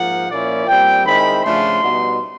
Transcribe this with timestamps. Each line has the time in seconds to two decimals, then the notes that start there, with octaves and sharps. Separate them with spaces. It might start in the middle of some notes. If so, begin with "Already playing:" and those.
Already playing: G#2 F3 A#3 F#5
0.29 A#2 F3 A#3 C#4 E4 D5
0.67 A#2 G3 C4 G5
1.05 D#3 G#3 C4 E4 B5
1.43 C#3 F3 A3 D4 F4 C6
1.82 B2 G3 B3 D#4